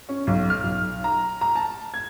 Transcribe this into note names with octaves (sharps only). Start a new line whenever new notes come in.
C#4
B1
F6
B1
A#5
A#5
A5
G#6